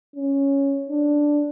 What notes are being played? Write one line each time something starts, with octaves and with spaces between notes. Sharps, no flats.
C#4
D4